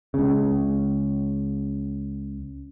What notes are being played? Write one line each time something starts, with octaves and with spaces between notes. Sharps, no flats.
C#2 C#3